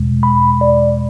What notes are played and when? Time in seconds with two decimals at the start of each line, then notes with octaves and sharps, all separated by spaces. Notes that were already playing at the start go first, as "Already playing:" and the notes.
Already playing: E2 B2 G#3
0.23 B5
0.61 D5